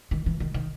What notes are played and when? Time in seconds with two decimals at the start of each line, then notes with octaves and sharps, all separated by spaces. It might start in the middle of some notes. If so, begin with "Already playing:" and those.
0.11 D#3
0.26 E3
0.40 D#3
0.54 D#3